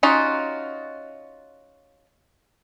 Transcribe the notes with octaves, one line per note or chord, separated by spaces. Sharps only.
C#4 D#4 F4 F#4